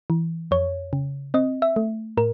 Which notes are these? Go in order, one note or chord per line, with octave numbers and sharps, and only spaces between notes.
E3
F2 C#5
C#3
C4 D#5
E5
A3
A2 A#4